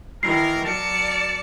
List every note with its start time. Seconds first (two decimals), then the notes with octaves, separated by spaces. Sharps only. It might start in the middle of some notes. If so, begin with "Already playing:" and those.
0.23 D#3 E3 A#4 C7
0.64 F#3 A#4 D5 A5 C#7